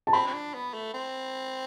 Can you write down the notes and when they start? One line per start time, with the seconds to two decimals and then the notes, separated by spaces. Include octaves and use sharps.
0.07 A5
0.13 C4 B5
0.27 C4
0.33 D4
0.54 B3
0.73 A3
0.94 C4